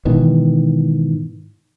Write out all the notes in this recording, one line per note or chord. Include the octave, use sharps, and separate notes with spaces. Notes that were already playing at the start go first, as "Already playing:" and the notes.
G#2 B2 D#3 E3